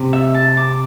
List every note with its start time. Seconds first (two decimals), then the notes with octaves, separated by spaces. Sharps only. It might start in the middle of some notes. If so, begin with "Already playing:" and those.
Already playing: C3
0.13 E5
0.35 A5
0.57 D6